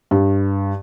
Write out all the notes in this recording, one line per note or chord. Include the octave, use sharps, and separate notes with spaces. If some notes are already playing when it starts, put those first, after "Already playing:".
G2